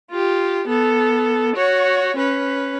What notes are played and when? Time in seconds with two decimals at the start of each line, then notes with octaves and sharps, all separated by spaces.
0.11 F4 G4
0.68 B3 A4
1.56 F#4 C#5
2.16 C#4 B4